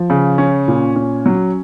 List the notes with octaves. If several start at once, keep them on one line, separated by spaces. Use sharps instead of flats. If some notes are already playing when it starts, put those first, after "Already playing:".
Already playing: F3
C#3
C#4
A#2
C#4
F#3